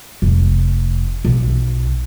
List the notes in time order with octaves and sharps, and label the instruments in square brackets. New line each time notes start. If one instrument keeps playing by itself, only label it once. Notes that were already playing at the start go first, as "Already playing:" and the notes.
[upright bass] F1
B1